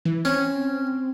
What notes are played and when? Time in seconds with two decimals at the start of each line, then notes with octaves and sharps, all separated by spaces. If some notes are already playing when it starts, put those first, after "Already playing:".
0.05 E3
0.25 C4 C#4